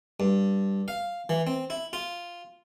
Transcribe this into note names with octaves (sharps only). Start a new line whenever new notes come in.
G2
F5
E3
C4
E4
F4